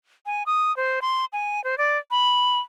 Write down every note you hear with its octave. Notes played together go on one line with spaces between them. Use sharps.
G#5
D#6
C5
C6
G#5
C5
D5
B5